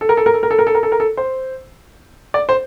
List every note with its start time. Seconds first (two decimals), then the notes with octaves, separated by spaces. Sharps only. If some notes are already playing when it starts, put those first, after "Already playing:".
0.01 A4
0.09 A#4
0.17 A4
0.26 A#4
0.34 A4
0.43 A#4
0.51 A4
0.59 A#4
0.67 A4
0.75 A#4
0.83 A4
0.92 A#4
1.00 A4
1.17 C5
2.34 D5
2.49 C5